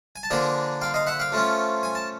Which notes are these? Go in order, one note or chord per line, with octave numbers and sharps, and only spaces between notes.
G#5
A5
D3 F3 A#3 D4 G#5 A#5
F5 G5
D#5 F5
E5 F#5
F5 G5
F3 A3 C#4 F4
G#5
A5